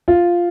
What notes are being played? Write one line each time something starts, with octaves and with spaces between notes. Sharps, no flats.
F4